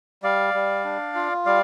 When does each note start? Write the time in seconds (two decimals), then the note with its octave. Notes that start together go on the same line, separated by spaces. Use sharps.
0.23 G3 D5 F5
0.54 G3
0.84 D4
1.15 F4
1.46 G3 D5 F5